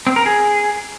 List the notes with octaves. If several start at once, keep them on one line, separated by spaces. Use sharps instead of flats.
C4
A#4
G#4